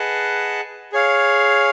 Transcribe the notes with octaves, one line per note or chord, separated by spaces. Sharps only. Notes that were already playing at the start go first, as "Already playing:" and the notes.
Already playing: G#4 B4 D#5 F#5 A5
G#4 C#5 F5